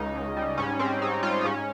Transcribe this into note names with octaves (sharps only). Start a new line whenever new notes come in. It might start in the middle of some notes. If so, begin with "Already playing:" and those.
Already playing: C#2 C#3 D#4
C#2
G3
G#2 C#4
G#2 C4
G#2 D#4
G3 F4
D#4
G#2 C#4